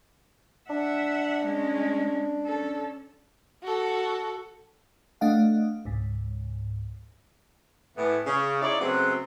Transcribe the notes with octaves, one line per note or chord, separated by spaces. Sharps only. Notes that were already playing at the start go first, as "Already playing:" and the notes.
D4 E5 F#5
G#3 C#4
C#4 A4
F#4 A4
A3 D4 D#5 F5 F#5
C#2 G#2
A2 E3 B3
C#3
D#4 E4 G#4 C#5 D5
C#3 F#3 G#3 A3 B3 C4